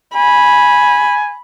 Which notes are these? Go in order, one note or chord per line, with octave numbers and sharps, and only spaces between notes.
G#5 B5